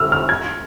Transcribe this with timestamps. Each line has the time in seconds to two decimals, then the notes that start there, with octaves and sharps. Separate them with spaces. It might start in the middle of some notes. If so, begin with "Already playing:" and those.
Already playing: E6 F6
0.12 F6
0.29 G#6